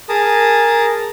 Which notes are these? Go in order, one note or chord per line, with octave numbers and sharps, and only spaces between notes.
G#4 A#4 A5 A#5 D#6